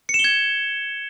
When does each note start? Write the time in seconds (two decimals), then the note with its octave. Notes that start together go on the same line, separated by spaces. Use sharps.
0.09 C#7
0.14 E7
0.19 G7
0.24 G#6